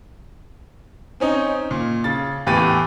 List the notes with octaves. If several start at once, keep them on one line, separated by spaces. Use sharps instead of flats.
C4 C#4 D#4
A#2
C#3 A6
E2 A2 E3 G4 A6 D#7